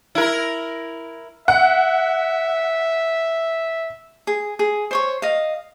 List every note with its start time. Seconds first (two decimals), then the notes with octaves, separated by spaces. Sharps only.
0.15 E4 A#4
1.48 E5 F#5
4.27 G#4
4.59 G#4
4.91 C5 C#5 C#6
5.22 D#5 F5